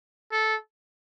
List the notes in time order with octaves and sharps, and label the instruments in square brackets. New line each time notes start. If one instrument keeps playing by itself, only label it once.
[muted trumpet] A4